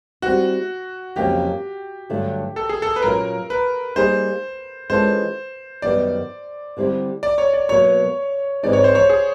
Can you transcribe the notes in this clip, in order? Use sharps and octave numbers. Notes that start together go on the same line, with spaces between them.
G3 C4 E4 F#4
F2 C#3 F#3 A#3 C#4 G4
G2 D3 F#3 A3 D4
A4
G#4
A4
B4
A#2 F#3 A#3 C#4 F4 A#4
B4
G3 A#3 D#4 G#4 C5
E3 G#3 C#4 F4 A4 C5
F#2 D#3 G3 B3 D5
D3 G3 C4 E4 G4
D5
C#5
D5
B2 F#3 A#3 C#5
G#2 E3 G#3 C4 D#4 D5
C#5
C5
C#5
G#4